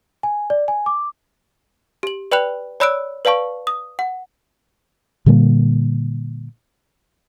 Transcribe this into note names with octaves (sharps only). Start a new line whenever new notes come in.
G#5
D5
G#5
D6
G4 F#7
B4 D5 G5 B5 F#6 F7
C#5 D5 B5 E6 F#6 D7
B4 D5 F5 A5 C#6
D#6
F#5
A#2 D3 G3 A#3